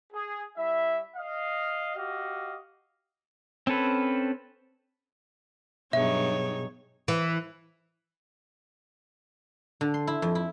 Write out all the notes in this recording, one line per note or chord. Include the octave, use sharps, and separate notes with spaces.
G#4
G3 E4 E5
D#5 F5
F#4 G4 D#5 F5
C4 C#4 A4 B4
G2 B2 F#3 B3 D#4 G#4 C#5 E5
E3
D3
C6
E4
F2
E4